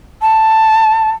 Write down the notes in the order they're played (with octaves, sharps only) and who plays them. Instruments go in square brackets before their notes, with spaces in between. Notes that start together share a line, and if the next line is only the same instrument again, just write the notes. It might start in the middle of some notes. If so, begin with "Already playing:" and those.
[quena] A5